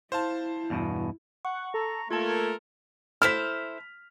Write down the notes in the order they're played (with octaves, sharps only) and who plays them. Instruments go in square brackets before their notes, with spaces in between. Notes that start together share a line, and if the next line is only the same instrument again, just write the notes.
[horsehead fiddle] E4 [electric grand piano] C5 F5 A5
[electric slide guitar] E2 G2 B2
[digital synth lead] F#5 [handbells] C#6
[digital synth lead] A4 [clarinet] A#5
[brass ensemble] A3 A#3 A#4 [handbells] F4 A5 [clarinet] A4 [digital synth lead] G#6
[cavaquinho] E4 A4 C5 [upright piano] F6 B6